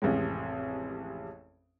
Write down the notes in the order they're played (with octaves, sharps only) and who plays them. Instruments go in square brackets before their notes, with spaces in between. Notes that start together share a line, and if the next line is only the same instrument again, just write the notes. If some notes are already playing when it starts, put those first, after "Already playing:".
[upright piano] A1 F2 C3 G#3